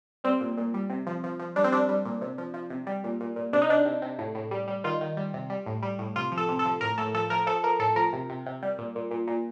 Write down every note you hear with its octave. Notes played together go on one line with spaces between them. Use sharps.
G3 C4
A#2
A#2
G3
C3
F3
F3
F3
G3 D4
C4
G3 D4
G3
A#2
C3
F3
F3
C3
G3
A#2
A#2
A#2
C3 D4
D#4
C3 D4
C3
C3
A2
A2
G3
G3
D#3 F4
D#3
G3
C3
G3
A2
G3
A2
C3 F4
F3
A4
C3
A4
F3
A2 A#4
A2 A4
F3 A4
F3 A#4
F3 A4
F3 A#4
A2 A4
F3 A#4
C3
C3
C3
G3
A#2
A#2
A#2
A#2